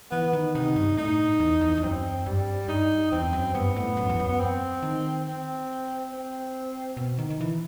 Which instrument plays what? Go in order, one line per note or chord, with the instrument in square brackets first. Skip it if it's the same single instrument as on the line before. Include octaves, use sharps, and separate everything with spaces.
[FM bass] E3 [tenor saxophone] B3
[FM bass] D#3
[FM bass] C3 [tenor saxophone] D#4
[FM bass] G2
[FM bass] A2 [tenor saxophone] D#4
[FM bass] E2
E2
[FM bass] E2 [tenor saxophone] D#4
[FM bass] F#2 [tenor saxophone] C4
[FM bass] G2 [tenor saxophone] G3
[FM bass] G2 [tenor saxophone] D#4
[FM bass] E2 [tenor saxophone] C4
[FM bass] F#2
[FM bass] G2 [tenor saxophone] B3
[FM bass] A2
F#2
E2
F#2
[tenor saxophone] B3
C4
[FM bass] D#3
[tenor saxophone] C4
C4
[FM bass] B2
D#3
D#3
E3